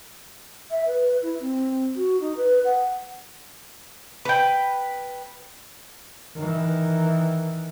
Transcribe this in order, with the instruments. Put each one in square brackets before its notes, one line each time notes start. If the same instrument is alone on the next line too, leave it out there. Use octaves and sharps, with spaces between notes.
[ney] E5
B4
E4
C4
F#4
D#4
B4
F#5
[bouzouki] B4 G5
[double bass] D#3 E3